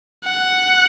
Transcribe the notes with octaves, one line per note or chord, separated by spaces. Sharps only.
F#5